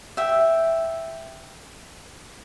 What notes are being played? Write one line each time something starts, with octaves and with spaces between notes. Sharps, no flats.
E5 G5